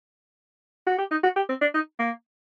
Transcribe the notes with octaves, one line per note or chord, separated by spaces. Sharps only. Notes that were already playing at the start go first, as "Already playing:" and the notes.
F#4
G4
D#4
F#4
G4
C4
D4
D#4
A#3